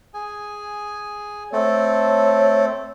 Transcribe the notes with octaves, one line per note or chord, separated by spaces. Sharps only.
G#4 G#5
A3 C4 A4 C#5